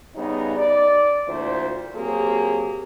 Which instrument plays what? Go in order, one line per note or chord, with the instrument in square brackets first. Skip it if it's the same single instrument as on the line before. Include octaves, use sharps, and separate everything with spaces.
[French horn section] C#3 G3 B3 D#4
D5
D2 A#2 F3 E4 C5
F#3 A#3 C4 G4 G#4